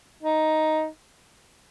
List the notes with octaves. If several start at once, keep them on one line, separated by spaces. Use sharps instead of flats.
D#4